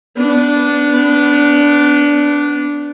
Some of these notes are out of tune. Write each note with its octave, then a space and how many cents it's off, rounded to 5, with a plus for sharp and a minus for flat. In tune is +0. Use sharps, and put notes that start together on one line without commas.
B3 +20 D4 -10